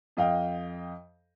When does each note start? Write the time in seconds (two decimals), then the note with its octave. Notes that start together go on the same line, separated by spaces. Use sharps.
0.17 F2 D#5 F5 G5